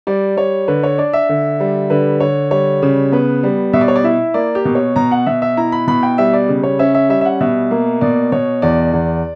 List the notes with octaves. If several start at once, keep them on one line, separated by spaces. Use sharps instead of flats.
G3 D5
G3 C#5
D3 B4
C#5
D4 D5
E5
D3
G3
D3 B4
D3 C#5
G3 C#5
C#3
B3 B4
G3
B2 E5
D5
C#5
D5
E4 E5
A#3 D5
G4
B2
C#5
B2 A#5
F#5
B2 E5
E5
E4 A#5
B5
B2 B5
G5
G3 E5
D5
C#3
C#5
C#4 E5
E5
G3 E5
E5
F#5
B2 E5
A#3
B2 D5
B2 C#5
E2 D5
E2